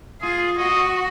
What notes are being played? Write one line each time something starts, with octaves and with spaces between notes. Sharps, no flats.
F4 G#4
F#4 D#5